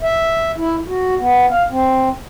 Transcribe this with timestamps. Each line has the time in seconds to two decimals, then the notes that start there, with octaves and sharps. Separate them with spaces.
0.02 E5
0.58 E4
0.88 F#4
1.17 B3
1.51 F5
1.70 C4